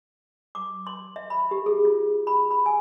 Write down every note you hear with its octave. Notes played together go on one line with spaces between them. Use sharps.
D6
C6
E5
B5
G4
G#4
F4
B5
B5
G#5